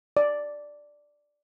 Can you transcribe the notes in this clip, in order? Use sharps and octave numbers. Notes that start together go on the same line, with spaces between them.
D5